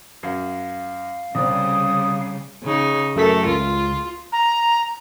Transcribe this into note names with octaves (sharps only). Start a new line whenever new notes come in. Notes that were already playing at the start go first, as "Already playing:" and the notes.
F#2 F5
C2 C#3 G3 D5 D#6
C#3 D#4
F#2 A3 A4 A#4 B6
C#2 F4
A#5